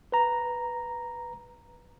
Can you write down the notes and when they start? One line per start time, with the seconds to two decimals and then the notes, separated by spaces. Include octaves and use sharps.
0.12 B4 A#5